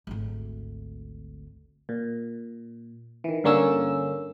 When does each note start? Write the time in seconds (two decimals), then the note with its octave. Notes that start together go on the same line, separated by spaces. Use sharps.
0.07 G#1 D2
1.89 A#2
3.24 D#3 E3
3.44 G2 D3 A#3 C#4 E6